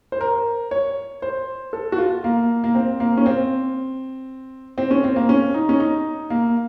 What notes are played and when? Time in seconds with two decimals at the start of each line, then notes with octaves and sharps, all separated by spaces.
0.12 C5
0.21 A#4
0.71 C#5
1.22 C5
1.73 A4
1.92 F#4
1.98 F4
2.24 A#3
2.64 A#3
2.75 C4
3.00 A#3
3.18 C#4
3.26 C4
4.78 C4
4.91 C#4
5.04 C4
5.16 A#3
5.29 C#4
5.54 D#4
5.69 C#4
5.80 D#4
6.30 A#3